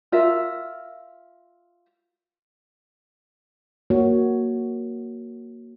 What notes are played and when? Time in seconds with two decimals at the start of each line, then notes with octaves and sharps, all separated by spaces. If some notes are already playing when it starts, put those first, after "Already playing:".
0.12 F4 A#4 E5
3.90 A#3 F#4 C#5